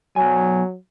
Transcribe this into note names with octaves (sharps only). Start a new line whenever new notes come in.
B1 F#3 G#5